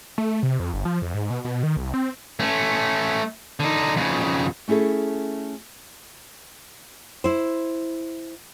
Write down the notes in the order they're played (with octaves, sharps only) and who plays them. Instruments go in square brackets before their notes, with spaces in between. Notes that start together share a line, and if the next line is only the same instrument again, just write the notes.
[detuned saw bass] A3
C3
F2
G1
F3
F2
G#2
B2
B2
D#3
C2
C4
[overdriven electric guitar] A3 C#4
D3 D#4
F2 C#3
[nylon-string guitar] A3 C#4 E4 G#4 A4
E4 C5